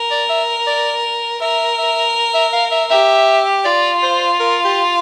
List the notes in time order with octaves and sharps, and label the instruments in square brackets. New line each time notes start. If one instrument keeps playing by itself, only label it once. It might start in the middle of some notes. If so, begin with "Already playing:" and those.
Already playing: [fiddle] A#4
[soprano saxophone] D5
E5
D5
[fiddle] A#4 [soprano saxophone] E5
[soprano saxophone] E5
E5
F5
E5
[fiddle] G4 [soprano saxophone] E5
[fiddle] F4 [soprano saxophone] D5
[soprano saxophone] C5
A#4
G4